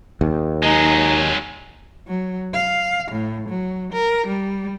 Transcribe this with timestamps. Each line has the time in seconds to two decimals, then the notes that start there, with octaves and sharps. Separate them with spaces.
0.21 D#2
0.63 F#3 G#3 D#4
2.08 F#3
2.54 F5
3.12 A2
3.49 F#3
3.93 A#4
4.27 G3